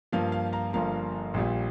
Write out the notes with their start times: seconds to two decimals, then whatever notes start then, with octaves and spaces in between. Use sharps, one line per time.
0.12 G2 F3 A#3 F5
0.32 F5
0.53 F5 A#5
0.73 G1 G2 F3 A#3 F5 A#5
1.34 A#1 A#2 G3